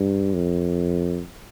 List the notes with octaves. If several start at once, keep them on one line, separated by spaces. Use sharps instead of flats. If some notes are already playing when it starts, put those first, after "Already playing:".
Already playing: G2
F2